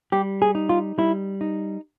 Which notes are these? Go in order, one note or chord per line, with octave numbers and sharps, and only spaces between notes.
G3 G4
G#4
D#4
F4
G3 E4
D#4